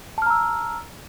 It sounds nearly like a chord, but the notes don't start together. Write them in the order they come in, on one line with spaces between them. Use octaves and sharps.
A5 F6 A#5 E6